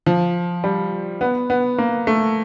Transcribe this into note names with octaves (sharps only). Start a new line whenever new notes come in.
F3
G3
B3
B3
A#3
A3